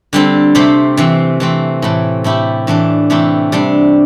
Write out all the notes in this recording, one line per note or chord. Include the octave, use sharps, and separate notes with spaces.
D3 G3 C4 A4
C3 A3 C4 G4
C3 E3 C4
E3 A3 C4
A2 E3 A3
A2 A3 E4 G4
A2 E3 A3 D4
C3 E3 A3 E4 G4
C3 G3 D4